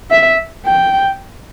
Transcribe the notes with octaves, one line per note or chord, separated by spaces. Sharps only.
E5
G5